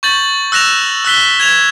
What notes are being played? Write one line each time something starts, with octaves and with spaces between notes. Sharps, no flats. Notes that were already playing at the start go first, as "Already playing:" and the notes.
C#6 G6 A6 F#7
E6 F#6 A#6 E7 F7
E6 F#6 B6 G7
G#6 E7 F7